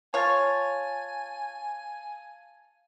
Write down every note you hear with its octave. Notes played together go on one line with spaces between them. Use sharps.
F4 C#5 F5 G#5 A5 A6